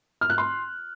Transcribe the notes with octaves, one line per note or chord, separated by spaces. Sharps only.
F6
F#6
C6